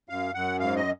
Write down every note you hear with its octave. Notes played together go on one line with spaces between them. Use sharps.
F#2 F5
F#2 F#5
G#2 F5
D#5